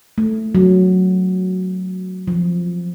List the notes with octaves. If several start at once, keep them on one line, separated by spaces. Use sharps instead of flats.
A3
F#3
F3